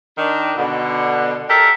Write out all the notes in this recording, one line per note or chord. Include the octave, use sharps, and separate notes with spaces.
D#3 D4
B2 D3
G4 A4 A#4 E5